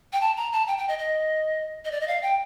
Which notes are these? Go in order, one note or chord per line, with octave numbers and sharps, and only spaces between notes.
G5
A5
A#5
A5
G5
G5
D#5
D#5
D#5
D5
D#5
F5
G5